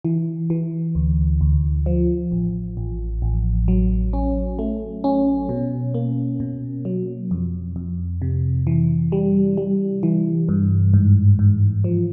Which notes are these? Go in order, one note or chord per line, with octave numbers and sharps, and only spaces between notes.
E3
E3
D2
D2
F3
A1
A1
A1
F#3
C#4
A3
C#4
B2
A#3
B2
F#3
F2
F2
C3
E3
G3
G3
E3
G2
G#2
G#2
F3